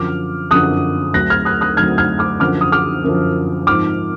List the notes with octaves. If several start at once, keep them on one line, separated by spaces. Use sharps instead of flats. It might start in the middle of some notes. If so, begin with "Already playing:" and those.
Already playing: F#2 D3 F3 D6 F6
F#2 D3 F3 D#6 F#6
D2 D3 F#3 F#6 A#6
F6 G#6
D#6 F#6
D#6 F#6
D2 D3 F#3 F6 G#6
F6 G#6
D6 F6
F#2 D3 F3 D6 F6
D#6
D6 F6
F#2 D3 F3
G#2 F3 D6 F6